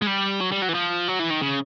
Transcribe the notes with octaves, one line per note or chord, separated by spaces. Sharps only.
G#3
G3
F#3
G3
F#3
E3
F3
F#3
E3
D#3
C#3